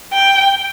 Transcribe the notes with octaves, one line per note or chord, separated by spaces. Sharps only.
G5